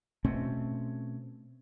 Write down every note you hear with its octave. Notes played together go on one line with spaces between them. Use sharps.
B2 A3 C4 C#4